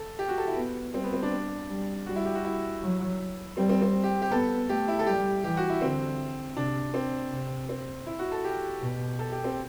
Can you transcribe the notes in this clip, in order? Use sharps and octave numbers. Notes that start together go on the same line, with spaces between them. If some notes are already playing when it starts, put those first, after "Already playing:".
Already playing: A4
G4
F#4
A4
E4
B3
G3 C4
B3
C4
D4
G3
G3 F#4
E4
G4
F#4
E4
F#3
G3 C4
C4
C4
G4
G4
B3 A4
A3 G4
E4
A4
G3 G4
E3 G4
F#4
E4
D3 C4
C3 D4
C4
C3
C4
E4
F#4
A4
G4
B2
A4
G4
C4